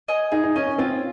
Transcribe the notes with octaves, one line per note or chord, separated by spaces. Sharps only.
D#5 G#5
D#4 G#4
D#4
C#4 D#5 G#5
C#4
C4 F4